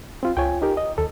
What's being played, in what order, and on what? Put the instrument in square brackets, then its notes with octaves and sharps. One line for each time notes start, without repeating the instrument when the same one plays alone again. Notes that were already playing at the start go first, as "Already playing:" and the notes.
[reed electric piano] C4 F4
[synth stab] C#2 F4 C#5 [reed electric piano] G5 G#5
[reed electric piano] D#4 G4 A#4
D#5
[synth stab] D#2 [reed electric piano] A4